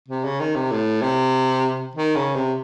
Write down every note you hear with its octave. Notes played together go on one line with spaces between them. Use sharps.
C3
C#3
D#3
C3
A2
C3
D#3
C#3
C3